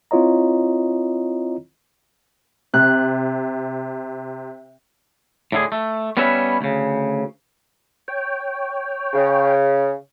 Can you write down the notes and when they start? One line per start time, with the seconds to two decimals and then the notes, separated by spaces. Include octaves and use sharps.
0.11 C4 E4 F4 C#5 D#5 A#5
2.74 C3 F#6
5.52 A2 D3 G#4
5.72 A3
6.17 G3 B3 C#4 B4 C#5 E5
6.61 D2 C#3
8.08 C#5 G5
9.13 C#3